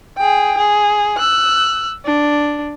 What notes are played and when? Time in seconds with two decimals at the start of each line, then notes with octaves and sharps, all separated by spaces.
0.18 G#4 G5
0.57 G#4
1.17 E6 F#6
2.05 D4